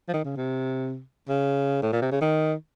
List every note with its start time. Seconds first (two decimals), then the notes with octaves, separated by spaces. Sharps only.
0.09 F3
0.14 D#3
0.25 C#3
0.37 C3
1.29 C#3
1.83 A2
1.93 A#2
2.02 C3
2.12 C#3
2.21 D#3